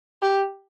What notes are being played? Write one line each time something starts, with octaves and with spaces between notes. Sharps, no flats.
G4